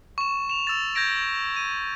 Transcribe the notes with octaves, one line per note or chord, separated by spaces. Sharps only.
C#6 E7
E7 F7
E6 A6
G6 G#6 A#6 D7
D#7